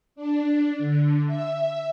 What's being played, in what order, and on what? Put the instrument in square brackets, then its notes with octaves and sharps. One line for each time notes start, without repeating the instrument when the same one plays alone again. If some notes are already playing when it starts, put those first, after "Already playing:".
[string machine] D4
D3
E5